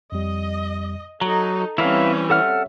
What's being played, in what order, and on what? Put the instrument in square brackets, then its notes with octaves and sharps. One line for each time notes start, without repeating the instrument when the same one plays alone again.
[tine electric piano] F2 G3 [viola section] D#5
[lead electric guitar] F#3 [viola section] D#4 A4 [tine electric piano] A#5
[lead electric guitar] E3 [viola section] G3 C4 C#4 [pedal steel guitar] E4 B4 F5
[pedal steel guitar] A4 F#5 F6 [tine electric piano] C#5 E5